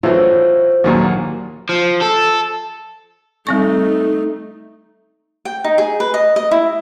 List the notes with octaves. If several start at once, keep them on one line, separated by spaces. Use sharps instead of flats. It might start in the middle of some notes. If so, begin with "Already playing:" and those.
A2 E3 F#3 F4 C5
A#1 D#2 A#2 F#3 F#4 A#5
F3
A4
G3 A3 C4 D#4 C#6
G5
D#4
G#4
B4
D#5
D#5
E4